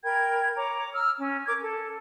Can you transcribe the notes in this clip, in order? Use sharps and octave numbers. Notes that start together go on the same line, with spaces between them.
A#4 G5 B5 G#6
C#5 A#5 D6
E6 F6
C#4
A#4 D6 G#6
A4